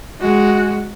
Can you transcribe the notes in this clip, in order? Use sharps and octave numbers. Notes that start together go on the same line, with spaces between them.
G#3 F#4